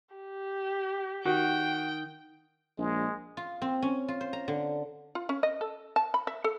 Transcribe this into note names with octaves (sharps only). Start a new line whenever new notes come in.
G4
D#3 F#4 G5
A#1 G#3
F4
C4
C#4
F4
C5
A#5
D3
F4
C#4
D#5
A4
A5
B5
E5
A4